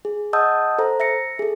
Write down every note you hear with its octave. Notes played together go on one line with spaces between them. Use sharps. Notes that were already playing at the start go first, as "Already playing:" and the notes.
G#4
D#5 F#5 A5 D#6 E6 G6
A4 C5 A#5
E5 A#6 C#7
G#4 A4